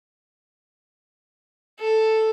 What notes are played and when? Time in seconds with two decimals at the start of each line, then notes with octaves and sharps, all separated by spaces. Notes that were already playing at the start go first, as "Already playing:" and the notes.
1.80 A4